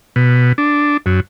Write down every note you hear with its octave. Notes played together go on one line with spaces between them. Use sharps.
B2
D4
F#2